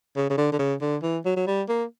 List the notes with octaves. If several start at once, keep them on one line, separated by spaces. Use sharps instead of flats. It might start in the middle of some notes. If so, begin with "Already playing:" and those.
C#3
C#3
D3
D3
C#3
D3
E3
F#3
F#3
G3
A#3